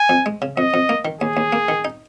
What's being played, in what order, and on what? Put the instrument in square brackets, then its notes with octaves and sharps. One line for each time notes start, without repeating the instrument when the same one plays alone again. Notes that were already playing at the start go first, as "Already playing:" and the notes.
Already playing: [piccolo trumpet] G#5
[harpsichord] F2
G#3
C#3
[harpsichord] F2 [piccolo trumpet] D#5
[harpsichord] F2
A#3
D#3
[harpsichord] D#2 [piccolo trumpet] G#4
[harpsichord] D#2
A#3
D#3
D#4